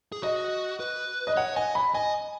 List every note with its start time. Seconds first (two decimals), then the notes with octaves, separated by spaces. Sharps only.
0.12 G#4
0.23 F#4 D#5
0.80 B4
1.27 D#5
1.37 C#5 F#5
1.56 D#5 G#5
1.75 B5
1.94 D#5 G#5